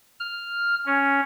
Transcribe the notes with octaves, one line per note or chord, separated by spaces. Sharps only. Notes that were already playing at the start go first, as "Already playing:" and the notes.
F6
C#4